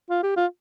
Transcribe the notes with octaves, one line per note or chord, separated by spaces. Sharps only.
F4
G4
F4